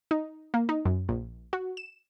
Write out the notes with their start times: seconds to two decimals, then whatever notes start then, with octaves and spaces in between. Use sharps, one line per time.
0.11 D#4
0.54 A#3
0.69 D#4
0.85 F#2
1.09 A#1
1.53 F#4
1.77 E7